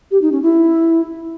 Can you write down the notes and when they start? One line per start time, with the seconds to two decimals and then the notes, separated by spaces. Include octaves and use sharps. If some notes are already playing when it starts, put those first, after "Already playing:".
0.11 G4
0.22 D#4
0.32 C#4
0.43 E4